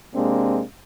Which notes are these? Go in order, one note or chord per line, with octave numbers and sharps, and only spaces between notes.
C3 G#3 A#3 C4 D4